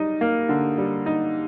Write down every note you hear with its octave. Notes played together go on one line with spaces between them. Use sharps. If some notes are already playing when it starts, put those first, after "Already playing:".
Already playing: G3 D#4
A#3
D3
G3
D#4